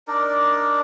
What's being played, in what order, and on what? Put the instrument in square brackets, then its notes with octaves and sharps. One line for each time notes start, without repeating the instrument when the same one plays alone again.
[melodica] D4 D#4 A#4 D5